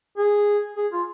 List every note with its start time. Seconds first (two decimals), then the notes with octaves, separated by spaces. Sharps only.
0.18 G#4
0.77 G#4
0.92 F4